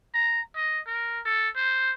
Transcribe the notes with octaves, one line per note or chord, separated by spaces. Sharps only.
A#5
D#5
A#4
A4
C5